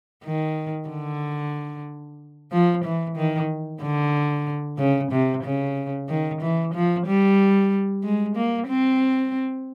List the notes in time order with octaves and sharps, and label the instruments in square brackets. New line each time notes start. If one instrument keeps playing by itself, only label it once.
[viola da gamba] D#3
D3
F3
E3
D#3
D3
C#3
C3
C#3
D#3
E3
F3
G3
G#3
A#3
C4